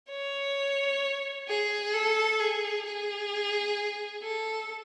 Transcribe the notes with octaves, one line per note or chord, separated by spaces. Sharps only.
C#5
G#4
A4
G#4
G#4
A4